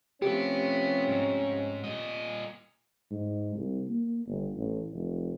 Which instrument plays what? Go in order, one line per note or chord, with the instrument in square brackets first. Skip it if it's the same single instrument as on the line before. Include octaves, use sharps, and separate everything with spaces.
[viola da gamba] C3 F3 A3 [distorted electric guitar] B3 [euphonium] C#4 [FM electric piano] G4
[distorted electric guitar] G#2
A#2 D#5
[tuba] G#2
C2
A#3
G1
A1
F1